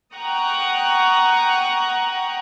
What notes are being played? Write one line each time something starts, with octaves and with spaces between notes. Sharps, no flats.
F#5 G5 A#5 C#6 D#6 F#6